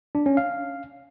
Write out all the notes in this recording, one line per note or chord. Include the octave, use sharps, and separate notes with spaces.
D4
C#4
F5